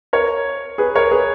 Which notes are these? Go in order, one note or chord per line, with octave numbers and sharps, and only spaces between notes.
A#4 C#5
G#4 B4
A#4 C#5
G#4 B4